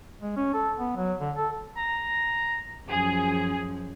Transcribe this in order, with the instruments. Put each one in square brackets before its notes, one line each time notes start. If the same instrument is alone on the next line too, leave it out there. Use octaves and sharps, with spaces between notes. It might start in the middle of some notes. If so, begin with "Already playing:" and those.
[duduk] G#3
C#4
A4
B3
F#3
D3
A4
[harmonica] A#5
[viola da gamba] F#2 F3 [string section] G#4